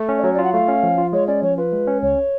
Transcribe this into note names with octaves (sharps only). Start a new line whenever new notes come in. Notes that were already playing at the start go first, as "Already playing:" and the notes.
Already playing: A3
C#4
D5
F#3 C#5
D5
F4
F#5
A3 F5
C#4
F3
F4
G#3 C#5
C#4 D5
F3 C#5
F4 B4
G#3
C#4
C#2 C#5